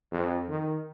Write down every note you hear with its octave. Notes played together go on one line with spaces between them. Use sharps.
F2
D#3